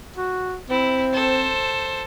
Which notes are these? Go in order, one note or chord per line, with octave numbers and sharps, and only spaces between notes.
F#4
C4 E4
A4 C5